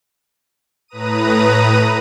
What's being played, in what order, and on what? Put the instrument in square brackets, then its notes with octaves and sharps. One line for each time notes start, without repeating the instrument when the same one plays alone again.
[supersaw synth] A2 B4 A#5 D#6 D#7